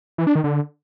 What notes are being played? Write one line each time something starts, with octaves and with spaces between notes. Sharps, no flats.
E3
D4
D#3
D3